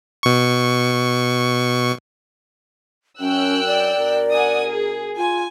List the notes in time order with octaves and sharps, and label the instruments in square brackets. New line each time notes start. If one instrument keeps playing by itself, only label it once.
[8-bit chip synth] B2 C#6
[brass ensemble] F#2 [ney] C#4 [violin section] G5 E6 F#6
[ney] D5
[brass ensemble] B2 D4 A#4
[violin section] F#5 G#5 D#6
G#4
[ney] F4 [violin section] G#5